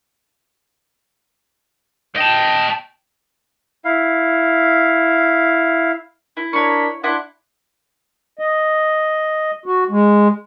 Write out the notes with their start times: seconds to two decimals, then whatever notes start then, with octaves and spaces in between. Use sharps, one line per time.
2.16 D#5 G5 A5
3.85 E4 F5
6.37 E4
6.53 D4 A#4 C#5 B5 C#6
7.04 D4 E4 D5 F#5 C6
8.39 D#5
9.66 F#4
9.90 G#3